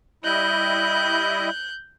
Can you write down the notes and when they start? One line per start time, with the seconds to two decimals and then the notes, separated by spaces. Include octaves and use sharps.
0.24 G3 E4 D#5 F#6 G6